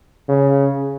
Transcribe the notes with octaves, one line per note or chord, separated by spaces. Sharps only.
C#3